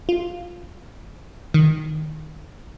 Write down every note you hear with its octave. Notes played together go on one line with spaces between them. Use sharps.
F4
D#3